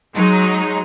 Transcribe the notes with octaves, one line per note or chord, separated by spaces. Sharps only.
F#3 G#3 D#4